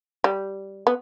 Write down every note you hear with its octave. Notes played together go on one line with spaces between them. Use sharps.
G3
B3